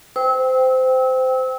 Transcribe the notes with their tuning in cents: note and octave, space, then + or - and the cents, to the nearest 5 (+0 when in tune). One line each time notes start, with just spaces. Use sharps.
C5 -20 G5 +0 E6 -30